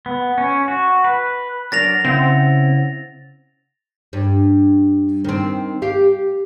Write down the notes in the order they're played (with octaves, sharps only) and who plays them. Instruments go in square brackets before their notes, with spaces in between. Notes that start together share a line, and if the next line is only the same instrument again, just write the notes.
[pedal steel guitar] B3
C#4
F#4
B4
[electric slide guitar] F#3 D4 A#4 [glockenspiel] A6 A#6 F7
[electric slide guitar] C#3 E4 F#5 [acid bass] C4
[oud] G2
D#3 C4
G4 F5